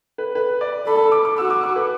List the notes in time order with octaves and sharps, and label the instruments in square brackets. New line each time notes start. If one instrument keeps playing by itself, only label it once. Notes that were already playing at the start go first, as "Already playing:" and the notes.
[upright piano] B4
B4
D5
[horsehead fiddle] A4 [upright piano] B5
[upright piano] B5
D6
D6
[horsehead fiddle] F#4 [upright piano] E6
[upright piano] D6
D6
B4